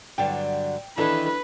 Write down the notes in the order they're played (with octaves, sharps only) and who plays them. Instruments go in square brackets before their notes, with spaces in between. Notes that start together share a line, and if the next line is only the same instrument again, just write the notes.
[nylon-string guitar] G2 D3 F#3 [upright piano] G5
[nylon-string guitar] D#3 E3 [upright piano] D4 E4 A4 [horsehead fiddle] B4